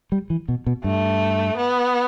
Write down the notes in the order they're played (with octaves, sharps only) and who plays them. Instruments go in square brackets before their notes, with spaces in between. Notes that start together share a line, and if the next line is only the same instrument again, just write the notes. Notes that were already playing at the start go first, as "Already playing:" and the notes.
[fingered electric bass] G3
E3
B2
B2
[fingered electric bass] G2 [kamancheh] A3
[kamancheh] B3